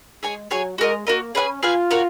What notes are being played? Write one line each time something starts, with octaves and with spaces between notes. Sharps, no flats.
G#3 G#4 C#5 G#5
F#3 G#4 C#5 G#5
G#3 F#4 A#4 D#5
A#3 F#4 A#4 D#5
C#4 G#4 B4 F5 G#5
F4 G#4 B4 F5 G#5
F#4 A#4 C#5